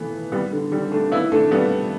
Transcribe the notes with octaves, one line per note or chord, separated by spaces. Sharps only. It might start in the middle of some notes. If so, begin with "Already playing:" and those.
Already playing: E3 A3 B3
G3 B3
D3
D3 G3
A3 D4
B3 E4
A3 D4
G3 B3